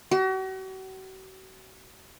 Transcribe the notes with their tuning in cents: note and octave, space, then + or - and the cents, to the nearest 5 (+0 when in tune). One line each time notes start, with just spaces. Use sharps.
F#4 +40